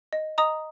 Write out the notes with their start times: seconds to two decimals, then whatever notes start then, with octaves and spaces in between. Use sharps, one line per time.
0.13 D#5
0.38 D#5 A#5 D#6